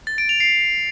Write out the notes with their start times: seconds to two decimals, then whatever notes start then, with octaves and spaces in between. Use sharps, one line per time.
0.07 A6
0.18 D7
0.29 F7
0.40 C7